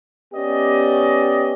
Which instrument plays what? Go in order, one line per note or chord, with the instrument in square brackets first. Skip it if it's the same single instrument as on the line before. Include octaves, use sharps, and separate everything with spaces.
[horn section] B3 C#4 G4 D5 D#5